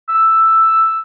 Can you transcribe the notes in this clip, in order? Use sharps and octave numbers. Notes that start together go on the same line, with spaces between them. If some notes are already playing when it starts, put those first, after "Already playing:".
E6